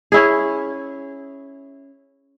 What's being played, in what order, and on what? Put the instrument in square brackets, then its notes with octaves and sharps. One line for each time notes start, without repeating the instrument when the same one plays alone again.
[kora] C#4 E4 G#4